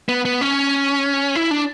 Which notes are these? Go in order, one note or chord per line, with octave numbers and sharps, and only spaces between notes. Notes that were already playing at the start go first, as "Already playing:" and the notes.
B3
B3
C#4
E4
D4